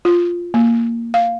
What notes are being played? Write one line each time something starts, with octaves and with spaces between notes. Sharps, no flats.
F4
A#3
F5